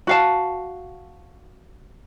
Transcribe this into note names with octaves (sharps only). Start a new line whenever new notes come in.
F#4 F5 A5